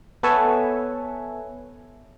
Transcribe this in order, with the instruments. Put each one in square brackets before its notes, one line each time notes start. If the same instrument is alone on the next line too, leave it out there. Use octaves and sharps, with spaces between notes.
[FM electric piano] B3 A4 B4 C#5 E5 G#5